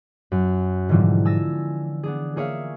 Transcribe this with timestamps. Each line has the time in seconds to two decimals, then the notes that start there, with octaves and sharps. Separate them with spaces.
0.32 F#2
0.89 G#2 B2 D3 E3 F3 G3
1.25 G#5 E6 A6 A#6
2.03 B3 D4 G#4
2.36 A#3 G#4 C#5 E5 F5